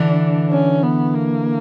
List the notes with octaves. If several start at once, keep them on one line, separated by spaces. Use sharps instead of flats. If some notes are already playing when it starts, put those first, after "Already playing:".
Already playing: D3 E3 D4
C#4
B3
A#3